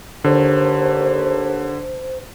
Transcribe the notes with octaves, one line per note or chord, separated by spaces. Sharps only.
D#2 D3 C5